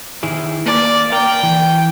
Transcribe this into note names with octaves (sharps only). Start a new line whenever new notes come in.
D#3 E4 G#4
A#3 D5
A#4 G5
E3